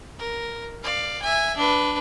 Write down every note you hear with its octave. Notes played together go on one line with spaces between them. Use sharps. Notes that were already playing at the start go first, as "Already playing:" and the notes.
A#4
D5 F5
E5 G#5
D4 B4